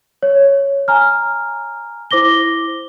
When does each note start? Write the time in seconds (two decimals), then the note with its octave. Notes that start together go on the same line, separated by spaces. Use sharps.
0.23 C#5
0.88 G#5 A#5 F6
2.11 E4 C5 D6 A#6 G7